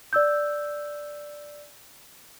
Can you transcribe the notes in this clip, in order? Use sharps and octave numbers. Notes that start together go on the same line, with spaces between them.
D5 E6 G6